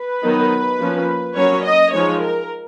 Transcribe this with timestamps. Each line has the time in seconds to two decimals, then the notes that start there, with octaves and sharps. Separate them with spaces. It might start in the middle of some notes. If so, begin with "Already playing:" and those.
Already playing: B4
0.22 D#3 F#3 B3 D#4
0.79 F3 A#3 C#4
1.36 F#3 A#3 C#4 C#5
1.64 D#5
1.93 F3 G#3 D#4 C#5
2.22 A#4